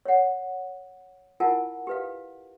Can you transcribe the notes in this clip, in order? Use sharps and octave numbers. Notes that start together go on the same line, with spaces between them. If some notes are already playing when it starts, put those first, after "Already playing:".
C#5 F#5
E4 F4 A#4 F#5 G#5 A5
G4 B4 F5